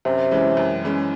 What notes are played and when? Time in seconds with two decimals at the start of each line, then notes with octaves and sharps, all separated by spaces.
0.05 F#2 C3
0.31 E3 G#3 C#4
0.57 F#2
0.84 E3 G#3 C#4